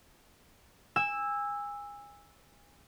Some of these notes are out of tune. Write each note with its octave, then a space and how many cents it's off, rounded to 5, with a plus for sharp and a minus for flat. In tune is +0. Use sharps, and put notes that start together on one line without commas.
G#5 -25 E6 +0